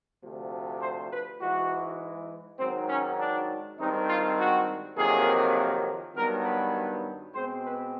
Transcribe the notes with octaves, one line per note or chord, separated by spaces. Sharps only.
D2 C3 F3
C5
B4
G#2 E3 G#3 F#4
G#2 D#3 F#3 C4
C#4
D4
G2 D#3 G#3 C4 D#4
F4
F#4
F2 C3 D#3 F#3 A#3 G#4
G2 D#3 F#3 B3 A#4
B4
B2 G#3 C4 C5
B4